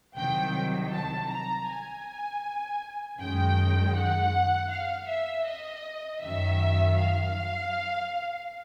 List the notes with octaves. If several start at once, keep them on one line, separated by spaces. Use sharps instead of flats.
C2 C3 D#3 F#3 G5
A5
A#5
G#5
F#2 D#3 G#3 G5
F#5
F5
E5
D#5
F#2 D#3 F#3 E5
F5